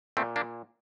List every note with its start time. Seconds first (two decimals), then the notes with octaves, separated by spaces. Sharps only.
0.17 A#2 A3 C4
0.36 A#3 D4